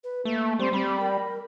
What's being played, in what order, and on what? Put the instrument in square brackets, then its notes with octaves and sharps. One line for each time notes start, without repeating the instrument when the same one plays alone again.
[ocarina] B4
[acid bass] A3 [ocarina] A#3
[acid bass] G3 [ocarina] C4 [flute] C5
[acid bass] G3 [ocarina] C4 [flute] B5
[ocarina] A#4